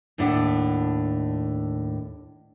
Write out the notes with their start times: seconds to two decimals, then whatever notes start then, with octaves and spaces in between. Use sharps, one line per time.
0.18 D#2 A2 D4 E4 F#5